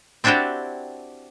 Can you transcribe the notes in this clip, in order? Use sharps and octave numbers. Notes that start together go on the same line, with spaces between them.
C4 D4 E4 F#4 G4 D5